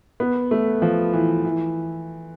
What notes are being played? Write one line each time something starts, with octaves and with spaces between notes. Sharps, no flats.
B3
A3
F3
E3
E3